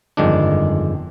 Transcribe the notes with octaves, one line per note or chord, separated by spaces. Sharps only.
G1 F2 D#3 G#3 D4